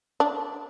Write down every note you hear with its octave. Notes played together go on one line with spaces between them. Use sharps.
D4